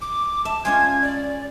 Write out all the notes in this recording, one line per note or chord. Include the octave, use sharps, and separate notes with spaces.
D6
E5 A5
G#3 C#4 F4 G#6
D5